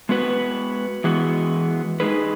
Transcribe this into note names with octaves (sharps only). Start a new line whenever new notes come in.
G#3 B3 F#4 B4
E3 G#3 B3 F#4
G#3 D#4 G#4 B4